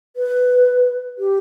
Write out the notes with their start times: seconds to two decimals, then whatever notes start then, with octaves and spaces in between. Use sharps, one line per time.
0.16 B4
1.18 G4